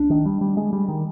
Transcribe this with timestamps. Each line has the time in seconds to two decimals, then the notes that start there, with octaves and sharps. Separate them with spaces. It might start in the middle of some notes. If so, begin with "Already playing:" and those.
Already playing: D4
0.10 D#3
0.26 G3
0.41 G3
0.57 G#3
0.73 G3
0.88 D#3